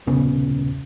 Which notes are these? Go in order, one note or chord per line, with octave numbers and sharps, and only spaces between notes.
D#1 C2 C#3 B3